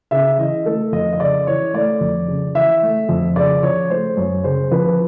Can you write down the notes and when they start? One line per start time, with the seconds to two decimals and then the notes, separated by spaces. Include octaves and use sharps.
0.11 C#3 E5
0.38 E3 D#5
0.66 A3 A4
0.92 F2 D#5
1.13 D#5
1.20 C#3 D5
1.47 E3 C#5
1.74 A3 D5
2.01 F2
2.28 C#3
2.55 E3 E5
2.82 A3
3.09 F2
3.36 C#3 D5
3.63 F3 C#5
3.90 A3 C5
4.17 F#2 C#5
4.44 C#3 C5
4.71 F3 B4